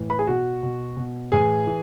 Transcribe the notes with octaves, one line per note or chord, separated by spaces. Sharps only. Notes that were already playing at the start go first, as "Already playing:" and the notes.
Already playing: A2 E3
B4 B5
G#4 G#5
B2 F#4 F#5
B2
B2
A2 E3 G#4 G#5
E3